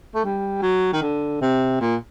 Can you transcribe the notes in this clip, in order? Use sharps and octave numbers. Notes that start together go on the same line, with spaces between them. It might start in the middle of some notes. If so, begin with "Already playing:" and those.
A3
G3
F#3
D#3
D3
C3
A#2